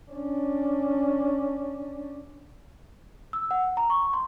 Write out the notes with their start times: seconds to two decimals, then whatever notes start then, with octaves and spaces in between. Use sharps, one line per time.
0.11 C#4 D4
3.33 E6
3.51 F#5
3.77 A#5
3.90 C#6
4.13 C6